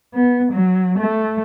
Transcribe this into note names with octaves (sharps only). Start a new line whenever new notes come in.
B3
F#3
A3